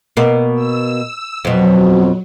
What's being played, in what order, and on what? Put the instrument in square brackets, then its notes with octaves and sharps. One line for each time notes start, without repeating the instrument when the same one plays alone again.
[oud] B2 A#3
[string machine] E6
[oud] F2 B2 [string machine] F#3